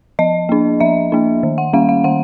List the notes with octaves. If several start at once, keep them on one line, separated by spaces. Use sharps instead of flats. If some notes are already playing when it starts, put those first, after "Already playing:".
F3 D#5
A#3 D4
F3 E5
A#3 D4
D#3
F#5
G3 A#3 C#4 F5
F5
D#3 F#5